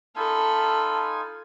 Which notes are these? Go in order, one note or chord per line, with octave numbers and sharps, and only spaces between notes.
D#4 F4 A4 G#5 A5 B5